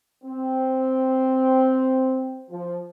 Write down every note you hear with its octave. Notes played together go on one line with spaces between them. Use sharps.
C4
F3